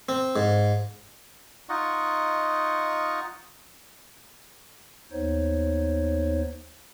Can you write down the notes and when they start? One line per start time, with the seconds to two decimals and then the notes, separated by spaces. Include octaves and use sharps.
0.09 C4
0.36 G#2
1.69 D#4 F4 D#5 F#5 C#6
5.12 D#2 B3 D#4 C5 C#5